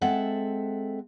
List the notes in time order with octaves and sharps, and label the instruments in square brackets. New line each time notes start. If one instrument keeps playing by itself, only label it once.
[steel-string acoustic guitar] G#3 C4 A4 E5 F#5